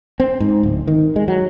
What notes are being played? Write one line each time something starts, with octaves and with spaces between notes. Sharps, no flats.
C4
G#2
D1
D#3
G#3
F#3